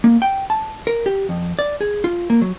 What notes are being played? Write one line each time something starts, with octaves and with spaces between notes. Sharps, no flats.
A#3
G5
A5
A#4
G4
F2
D5
G#4
F4
A#3
F#3